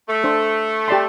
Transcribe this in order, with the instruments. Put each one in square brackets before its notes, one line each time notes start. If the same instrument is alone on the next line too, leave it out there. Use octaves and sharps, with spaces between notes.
[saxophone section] A3
[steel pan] D4 A4 C5
G4 D5 A5 C6